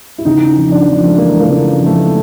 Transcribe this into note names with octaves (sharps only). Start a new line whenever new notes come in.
E4
C#3 D#4
F2
D4
F2
A3
E3 A#3
A#3
C#3
F2
A3